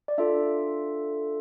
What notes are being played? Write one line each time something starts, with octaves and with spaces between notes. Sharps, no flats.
D5
D4 F4 A4 E5